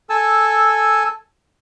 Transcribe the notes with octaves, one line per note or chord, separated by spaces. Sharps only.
A4 G#5 A5 E6